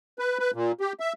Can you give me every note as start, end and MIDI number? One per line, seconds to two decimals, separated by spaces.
0.19 0.38 71
0.39 0.51 71
0.54 0.72 46
0.80 0.93 67
1.00 1.13 76